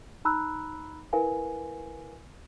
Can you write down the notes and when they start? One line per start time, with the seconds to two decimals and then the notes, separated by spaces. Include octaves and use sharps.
0.25 D#4 A#5 B5 E6 F#6
1.13 E4 A#4 B4 F5 G#5